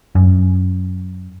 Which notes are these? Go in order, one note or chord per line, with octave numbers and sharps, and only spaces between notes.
F#2